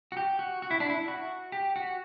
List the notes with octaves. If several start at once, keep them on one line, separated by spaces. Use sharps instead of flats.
F#4
G4
F#4
F#4
E4
D4
E4
F#4
G4
F#4